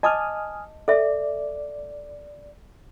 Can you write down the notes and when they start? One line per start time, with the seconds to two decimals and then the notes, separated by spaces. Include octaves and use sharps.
0.03 D#5 G#5 A5 D6 D#6 F6
0.88 A4 D5 E5